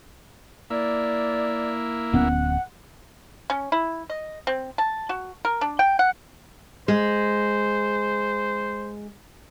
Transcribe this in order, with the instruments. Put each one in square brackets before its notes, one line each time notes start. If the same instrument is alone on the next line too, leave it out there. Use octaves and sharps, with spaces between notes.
[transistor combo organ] A#3 E4 [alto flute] D5
[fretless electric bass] D1 B3 C#4 [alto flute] F#5
[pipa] C#4
E4
D#5
C4
A5
F#4
A#4
D4
G5
F#5
[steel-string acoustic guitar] G#3 [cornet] C5